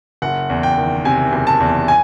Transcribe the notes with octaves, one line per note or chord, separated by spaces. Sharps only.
F#1 F#5
E2
G5
D#3
C3 G#5
F#1
A5
E2
G#5